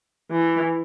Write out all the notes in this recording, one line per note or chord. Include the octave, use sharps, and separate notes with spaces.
E3